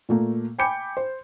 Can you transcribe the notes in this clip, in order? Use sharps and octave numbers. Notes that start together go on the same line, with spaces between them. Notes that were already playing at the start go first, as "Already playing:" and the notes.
A#2 A3 A#3
G5 G#5 B5 D6 G6 C#7
C5